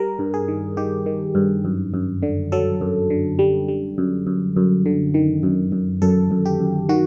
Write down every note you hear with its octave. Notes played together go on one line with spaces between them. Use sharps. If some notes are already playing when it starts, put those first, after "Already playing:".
Already playing: G3 A#4
G2
G#4
D#3
D#3 G4
D#3
G2
F#2
F#2
D3
F#3 A4
F#2
D3
G3
G3
F#2
F#2
F#2
D3
D#3
F#2
F#2
F#2 A4
F#2
G4
F#2
D#3 F#4